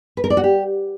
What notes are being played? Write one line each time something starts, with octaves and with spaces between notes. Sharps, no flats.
B4
A#4
D5
F#4
G4